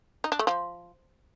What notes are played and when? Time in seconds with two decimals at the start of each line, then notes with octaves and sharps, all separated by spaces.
0.24 D#4
0.32 D4
0.39 A3
0.47 F3